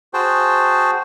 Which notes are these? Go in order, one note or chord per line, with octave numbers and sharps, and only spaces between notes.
F#4 G#4 C5 G5 A5